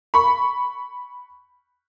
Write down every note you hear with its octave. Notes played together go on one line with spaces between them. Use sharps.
B5 C#6